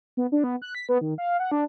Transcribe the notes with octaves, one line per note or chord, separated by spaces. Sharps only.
B3
D4
B3
F#6
B6
B3
D#3
F5
F#5
D4